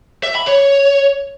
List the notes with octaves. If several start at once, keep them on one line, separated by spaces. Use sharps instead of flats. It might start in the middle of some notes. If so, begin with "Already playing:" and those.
E5
B5
C#5